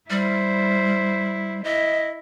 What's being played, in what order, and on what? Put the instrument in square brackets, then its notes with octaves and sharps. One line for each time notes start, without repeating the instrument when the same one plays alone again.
[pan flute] G3 [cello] E4 C5
[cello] E4 [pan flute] D#5